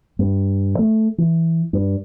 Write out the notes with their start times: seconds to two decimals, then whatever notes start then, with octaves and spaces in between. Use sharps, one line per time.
0.19 G2
0.79 A3
1.18 E3
1.73 G2